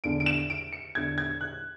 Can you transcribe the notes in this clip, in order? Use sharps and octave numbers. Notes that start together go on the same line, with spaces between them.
E2 D3 D7
D7
E7
D7
C#7
E2 D3 G#6
G#6
F#6